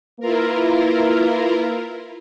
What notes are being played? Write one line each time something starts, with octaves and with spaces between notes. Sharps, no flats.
A#3 E4 F4 A#4 B4